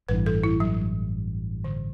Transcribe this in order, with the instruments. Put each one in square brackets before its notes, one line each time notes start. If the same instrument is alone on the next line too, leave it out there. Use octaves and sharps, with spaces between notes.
[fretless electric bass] A1 G2 E3 [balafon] B4
[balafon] A4
E4
F#3
D3